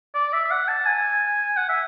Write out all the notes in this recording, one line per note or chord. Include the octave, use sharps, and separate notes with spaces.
D5
E5
E5
F#5
A5
G#5
F#5
E5